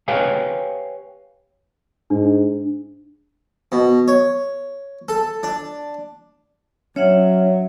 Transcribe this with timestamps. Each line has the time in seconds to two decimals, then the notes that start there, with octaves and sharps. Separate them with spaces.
0.08 G4 B4 C#5 F5 G5 G#5
2.10 G#2 D4
3.72 B2
4.08 C#5
5.09 A4
5.43 D4
6.96 F#3 C#4 C#5 E5 F#5